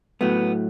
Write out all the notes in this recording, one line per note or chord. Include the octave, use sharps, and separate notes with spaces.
A2 F#3 A3 B3